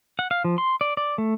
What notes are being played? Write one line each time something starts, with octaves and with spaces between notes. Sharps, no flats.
F#5
F5
F3
C6
D5
D5
A3